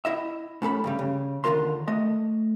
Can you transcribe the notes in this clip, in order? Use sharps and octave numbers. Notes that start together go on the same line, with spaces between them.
E4 D#5 E5
A2 C#4 A4 B5
G2 C#3 G3
C#3
D#2 D3 G#3 F4 A#4 C6
A3 D#5